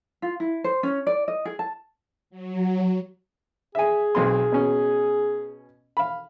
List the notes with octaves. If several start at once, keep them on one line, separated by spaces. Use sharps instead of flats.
F4
E4
C5
C#4
D5
D#5
G#4
A5
F#3
G#4 E5 G#5
B1 C4 C6
B2 C#4
F5 B5